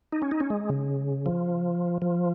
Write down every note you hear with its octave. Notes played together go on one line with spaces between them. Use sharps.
D#4
C#4
D#4
C#4
G#3
C#3
F3
F3